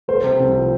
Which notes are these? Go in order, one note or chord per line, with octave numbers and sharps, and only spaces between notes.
A3 C5
C3
C2
F3